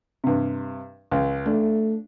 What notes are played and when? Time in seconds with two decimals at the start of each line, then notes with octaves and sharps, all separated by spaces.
0.24 G2 C3
1.11 C#2
1.46 A3 D4